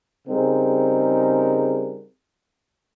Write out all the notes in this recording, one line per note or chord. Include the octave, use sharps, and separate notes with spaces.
C#3 G3 C4 D#4 G#4 A#4